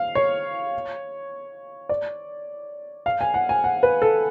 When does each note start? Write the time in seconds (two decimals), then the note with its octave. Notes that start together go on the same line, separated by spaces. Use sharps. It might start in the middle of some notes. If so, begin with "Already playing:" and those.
Already playing: F5
0.15 C#5
1.89 D5
3.06 F5
3.21 G#5
3.34 F#5
3.49 G#5
3.64 F#5
3.83 B4
4.02 A4